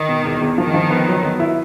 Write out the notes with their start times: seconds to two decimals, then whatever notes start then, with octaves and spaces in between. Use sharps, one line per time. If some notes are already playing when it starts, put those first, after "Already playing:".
Already playing: D#3
0.09 B2
0.25 E2
0.42 E2
0.58 D#3 F3
0.74 F3
0.90 B3
1.07 F#3
1.23 B3
1.40 E4